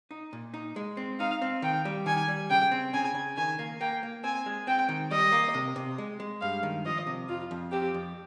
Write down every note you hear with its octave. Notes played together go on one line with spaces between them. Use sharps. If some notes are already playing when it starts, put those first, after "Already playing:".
D#4
A#2
D#4
G#3
C4
D#4 F5
C4
D#3 G5
G3
D#3 G#5
G3
C#3 G5
C4
C#3 G#5
C#3
D#3 G#5
A#3
A#3 G5
A#3
C4 G#5
G#3
C4 G5
D#3
G3 D#5
A#3
C3
C3
G#3
G#3
G2 F5
D#3
F3 D#5
C3
F2 F4
F2
C4 G4
F2